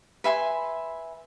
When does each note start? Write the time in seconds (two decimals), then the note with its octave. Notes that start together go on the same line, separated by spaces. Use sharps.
0.24 B4 E5 G#5 C6